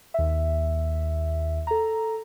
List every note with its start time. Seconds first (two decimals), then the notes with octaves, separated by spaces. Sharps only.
0.14 D#2 E5
1.67 A4 A#5